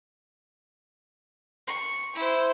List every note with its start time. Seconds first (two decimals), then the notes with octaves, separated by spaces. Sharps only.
1.67 C#6
2.15 E4 C5